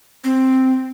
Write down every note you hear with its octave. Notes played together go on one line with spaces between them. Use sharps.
C4